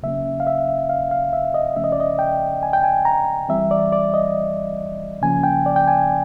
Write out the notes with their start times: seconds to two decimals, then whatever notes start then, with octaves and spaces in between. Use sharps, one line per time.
0.03 C#3 F#3 A#3 C#4 E5
0.40 F5
0.47 E5
0.89 F5
1.11 F5
1.33 E5
1.54 D#5
1.76 C#3 F3 A3 C#4 E5
1.84 D#5
1.92 D5
2.00 D#5
2.19 G5
2.63 G#5
2.73 G5
2.83 G#5
3.05 A#5
3.49 E3 G3 C4 E5
3.71 D5
3.92 D5
4.14 D#5
5.22 C#3 F3 A#3 C#4 G#5
5.43 G5
5.66 D5
5.76 G5
5.88 G#5